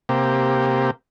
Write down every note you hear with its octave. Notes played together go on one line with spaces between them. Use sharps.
C3 A#3 G4